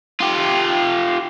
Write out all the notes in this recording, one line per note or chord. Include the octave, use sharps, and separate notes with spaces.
F4 G4